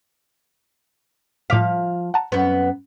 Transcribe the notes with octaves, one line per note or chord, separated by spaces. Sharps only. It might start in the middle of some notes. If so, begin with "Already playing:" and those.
A2 F3 F5 D6 B6
F#5 A5 A#5
F#2 B3